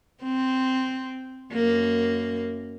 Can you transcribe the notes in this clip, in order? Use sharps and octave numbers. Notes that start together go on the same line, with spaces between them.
C4
F#2 A#3